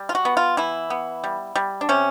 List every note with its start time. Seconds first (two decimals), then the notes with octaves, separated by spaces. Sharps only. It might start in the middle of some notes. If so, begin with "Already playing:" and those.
Already playing: G3
0.09 F4
0.15 F#4
0.25 B3
0.37 F4
0.57 E3 E4
0.90 B3
1.24 G3
1.56 G3
1.81 D4
1.89 C3 C#4